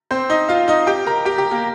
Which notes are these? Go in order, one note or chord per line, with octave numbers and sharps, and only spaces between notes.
C4 C5
D#4 D#5
F4 F5
D#4 D#5
G4 G5
A#4 A#5
G4 G5
G4
A#3 A#4